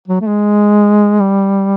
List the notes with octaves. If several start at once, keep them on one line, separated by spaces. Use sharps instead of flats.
F#3
A3
G#3
G3